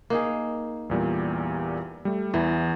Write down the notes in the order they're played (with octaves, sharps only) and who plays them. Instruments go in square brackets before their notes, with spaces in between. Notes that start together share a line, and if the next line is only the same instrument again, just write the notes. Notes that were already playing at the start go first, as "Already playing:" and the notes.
[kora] A#3 D#4 G#4
[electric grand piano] E2 A#2 G3
G3 A3
[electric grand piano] E2 [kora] E3